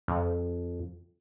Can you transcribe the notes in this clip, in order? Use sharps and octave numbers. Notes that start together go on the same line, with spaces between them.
F2